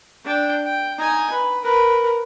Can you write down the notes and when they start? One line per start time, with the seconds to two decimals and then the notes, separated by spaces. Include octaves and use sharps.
0.24 D4 G5
0.65 G5
0.98 D#4 G#5
1.31 B4
1.63 A#4 B4